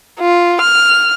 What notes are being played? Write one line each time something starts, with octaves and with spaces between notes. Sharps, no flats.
F4
F6